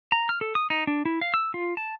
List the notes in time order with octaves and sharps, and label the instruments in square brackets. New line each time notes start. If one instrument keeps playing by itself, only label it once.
[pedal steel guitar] A#5
F6
A4
D#6
D#4
D4
E4
F5
E6
F4
A5